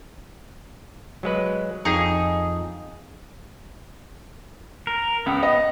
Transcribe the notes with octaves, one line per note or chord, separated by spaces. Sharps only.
F#3 G#3 B4
F2 D#4 G#4
A#4
C#2 B3
D#5